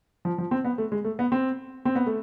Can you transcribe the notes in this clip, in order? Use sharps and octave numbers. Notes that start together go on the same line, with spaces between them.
F3
F3
C4
B3
A3
G#3
A3
B3
C4
C4
B3
A3